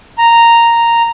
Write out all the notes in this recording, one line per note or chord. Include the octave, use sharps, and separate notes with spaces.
A#5